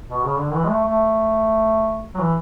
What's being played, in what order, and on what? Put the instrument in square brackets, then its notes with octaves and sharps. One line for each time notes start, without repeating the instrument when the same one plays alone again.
[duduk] B2
C#3
D3
E3
G#3
A3
A3
F#3
E3